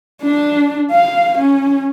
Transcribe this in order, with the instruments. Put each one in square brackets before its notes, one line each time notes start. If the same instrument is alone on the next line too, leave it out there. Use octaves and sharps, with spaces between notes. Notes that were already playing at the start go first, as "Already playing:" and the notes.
[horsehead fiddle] D4
F5
C#4